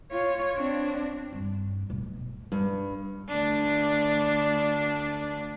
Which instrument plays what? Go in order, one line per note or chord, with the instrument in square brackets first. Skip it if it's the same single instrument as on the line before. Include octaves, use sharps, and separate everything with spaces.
[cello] F4 C#5
C4 D4
[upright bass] G2
D1 B2
[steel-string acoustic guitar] G2
[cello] D2 D4